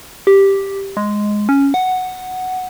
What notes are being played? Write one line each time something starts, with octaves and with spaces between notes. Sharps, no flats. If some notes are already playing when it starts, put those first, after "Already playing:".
G4
G#3
C#4
F#5